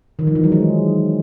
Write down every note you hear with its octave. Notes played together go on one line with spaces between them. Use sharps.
D#3
F3
E3
F#3
G#3